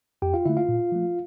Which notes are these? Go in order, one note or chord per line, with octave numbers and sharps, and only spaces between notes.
F2 G4 G5
F4 F5
D3 A3 E4 E5
F4 F5
A#2
F3 A3